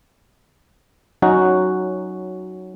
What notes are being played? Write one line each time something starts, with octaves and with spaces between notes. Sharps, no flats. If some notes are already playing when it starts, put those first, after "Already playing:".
F#3 C#4 D#4 F#4